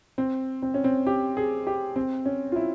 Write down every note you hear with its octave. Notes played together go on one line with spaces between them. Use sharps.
C4
C4
C#4
C4
G4
G#4
G4
C4
C#4
F4
E4